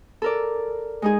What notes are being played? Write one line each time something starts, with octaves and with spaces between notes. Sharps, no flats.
A4 A#4 D5
G#3 D#4 G#4